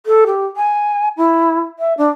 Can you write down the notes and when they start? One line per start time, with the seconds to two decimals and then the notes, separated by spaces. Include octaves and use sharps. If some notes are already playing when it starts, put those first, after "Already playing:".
0.06 A4
0.27 G4
0.56 G#5
1.17 E4
1.79 E5
1.98 D4